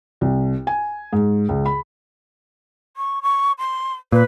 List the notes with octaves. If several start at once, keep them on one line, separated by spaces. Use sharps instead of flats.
C2
G#5
G#2
C#2
B5
C#6
C#6
C6
A#2 B4